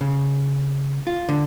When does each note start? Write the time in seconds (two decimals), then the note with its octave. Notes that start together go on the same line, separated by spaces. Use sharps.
0.01 C#3
1.07 F4
1.29 D3